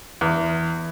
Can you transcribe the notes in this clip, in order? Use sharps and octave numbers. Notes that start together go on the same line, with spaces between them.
E2